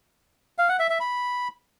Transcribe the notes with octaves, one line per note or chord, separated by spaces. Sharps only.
F5
F#5
E5
E5
B5